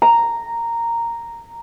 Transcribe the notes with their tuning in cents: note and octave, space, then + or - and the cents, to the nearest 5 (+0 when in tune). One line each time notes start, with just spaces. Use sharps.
A#5 -5